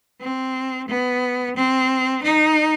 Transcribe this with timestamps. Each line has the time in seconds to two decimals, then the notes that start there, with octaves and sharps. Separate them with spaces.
0.20 C4
0.88 B3
1.56 C4
2.23 D#4